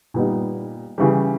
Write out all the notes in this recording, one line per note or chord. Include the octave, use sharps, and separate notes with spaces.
A#2 G3 B3 D#4
C#3 E3 G3